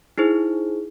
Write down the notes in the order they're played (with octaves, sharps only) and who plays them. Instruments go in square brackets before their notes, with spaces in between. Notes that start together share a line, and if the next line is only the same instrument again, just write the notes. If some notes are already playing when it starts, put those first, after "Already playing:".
[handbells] D#4 E4 G#4 C5